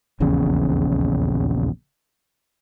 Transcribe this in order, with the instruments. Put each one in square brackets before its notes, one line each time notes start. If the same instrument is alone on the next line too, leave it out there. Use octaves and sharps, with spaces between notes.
[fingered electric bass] D#1 A#1 E2 C#3